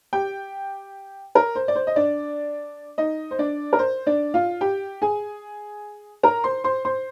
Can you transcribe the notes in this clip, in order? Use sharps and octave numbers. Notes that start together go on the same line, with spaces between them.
G4 G5
A#4
C5
D5
C5
D#5
D4 D5
D#4 D#5
C5
D4 D5
A#4
C5
D4 D5
F4 F5
G4 G5
G#4 G#5
A#4 A#5
C5 C6
C5 C6
C5 C6